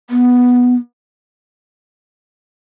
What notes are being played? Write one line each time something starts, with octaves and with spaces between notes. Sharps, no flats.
B3